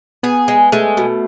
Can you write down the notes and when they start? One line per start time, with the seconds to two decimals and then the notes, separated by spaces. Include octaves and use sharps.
0.23 B3 G#4
0.48 G#3
0.72 G#3 A3
0.97 B2